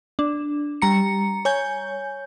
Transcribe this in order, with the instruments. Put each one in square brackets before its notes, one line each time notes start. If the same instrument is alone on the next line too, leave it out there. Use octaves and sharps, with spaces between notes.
[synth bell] D4
G3 A#5 C#7
C#5 G#5 G6